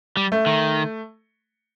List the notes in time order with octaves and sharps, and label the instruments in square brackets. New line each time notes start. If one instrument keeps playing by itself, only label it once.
[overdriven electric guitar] G3
[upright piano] A3
[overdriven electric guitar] D#3